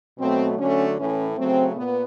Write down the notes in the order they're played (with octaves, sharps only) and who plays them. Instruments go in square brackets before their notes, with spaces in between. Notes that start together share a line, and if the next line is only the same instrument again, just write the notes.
[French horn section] B2 F#3 A3 C4
D3 F#3 A3 C#4
A2 E3 A3 C#4
C#3 F#3 A3 C4
A#2 B3